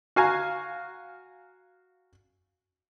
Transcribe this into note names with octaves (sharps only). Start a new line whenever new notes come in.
F#4 F5 G#5 A#5